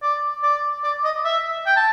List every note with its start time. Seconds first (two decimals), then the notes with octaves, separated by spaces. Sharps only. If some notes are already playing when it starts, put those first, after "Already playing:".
0.02 D5
0.43 D5
0.84 D5
1.04 D#5
1.25 E5
1.66 G5
1.76 A5